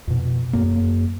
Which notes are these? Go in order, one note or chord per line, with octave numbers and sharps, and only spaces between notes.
F2 B2
F#2 A#3